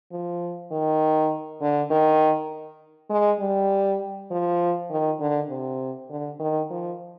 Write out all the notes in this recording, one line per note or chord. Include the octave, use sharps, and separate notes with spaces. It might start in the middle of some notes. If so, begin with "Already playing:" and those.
F3
D#3
D3
D#3
G#3
G3
F3
D#3
D3
C3
D3
D#3
F3